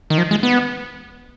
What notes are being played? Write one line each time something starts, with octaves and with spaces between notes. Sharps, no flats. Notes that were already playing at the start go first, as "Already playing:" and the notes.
D#3
F3
G#3
B3